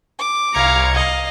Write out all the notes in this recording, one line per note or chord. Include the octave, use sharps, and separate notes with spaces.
D6
C2 F5 A#5 G#6 C#7
D#5 F5